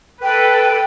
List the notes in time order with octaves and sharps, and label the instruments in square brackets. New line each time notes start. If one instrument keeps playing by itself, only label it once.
[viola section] A4 B4 [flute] G5